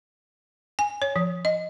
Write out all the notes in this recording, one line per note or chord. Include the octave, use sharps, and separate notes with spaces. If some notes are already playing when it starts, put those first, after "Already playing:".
G#5
C#5
F3
D#5